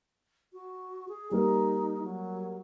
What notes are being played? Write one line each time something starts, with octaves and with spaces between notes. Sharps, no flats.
F#4
G#4
G3 A#3 D#4
F#3